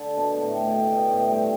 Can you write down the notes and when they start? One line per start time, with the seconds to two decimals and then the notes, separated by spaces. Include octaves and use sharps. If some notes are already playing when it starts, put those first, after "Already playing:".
Already playing: D3
0.17 B2 A5
0.42 A2
0.55 G5
0.67 B2
0.92 B2
1.10 A2
1.29 G2